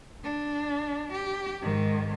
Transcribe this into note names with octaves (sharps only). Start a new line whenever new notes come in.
D4
G4
G#2 D#3